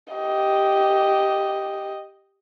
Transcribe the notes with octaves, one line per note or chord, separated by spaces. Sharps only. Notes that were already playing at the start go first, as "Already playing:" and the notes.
G4 D#5